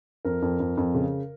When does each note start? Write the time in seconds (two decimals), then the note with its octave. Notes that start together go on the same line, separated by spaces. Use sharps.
0.25 F2 A#4
0.42 F2
0.60 F2
0.77 F2
0.95 C#3